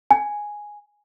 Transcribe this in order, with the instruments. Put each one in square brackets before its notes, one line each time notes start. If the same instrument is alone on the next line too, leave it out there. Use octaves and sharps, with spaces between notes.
[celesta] G#5